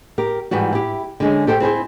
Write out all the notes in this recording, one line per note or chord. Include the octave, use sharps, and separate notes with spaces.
G4 A#4
G#2 E3 G3 F#4
E4 G4
D3 G#3 C#4
G4 A4 C5 G5
C4 E4 G#4 C5